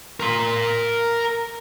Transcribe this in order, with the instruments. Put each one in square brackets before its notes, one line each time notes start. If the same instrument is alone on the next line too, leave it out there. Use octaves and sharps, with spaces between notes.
[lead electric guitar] A#4 C6